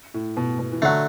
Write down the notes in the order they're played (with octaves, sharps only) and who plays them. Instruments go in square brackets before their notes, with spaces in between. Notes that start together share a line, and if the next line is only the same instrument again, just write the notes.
[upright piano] A2
B2
B2
E3
[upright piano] D3 [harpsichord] F#3 A3